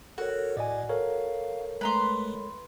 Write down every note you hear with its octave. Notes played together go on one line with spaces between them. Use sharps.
F#4 A4 A#4 C#5
A2 D5 D#5 G#5
A4 A#4 C#5 F5
G#3 A3 B4 A#5 C6